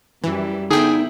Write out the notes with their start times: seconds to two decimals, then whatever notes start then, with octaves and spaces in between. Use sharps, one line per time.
0.24 F#2 E3 G3 E4
0.71 D3 B3 D#4 E4 G#4 G5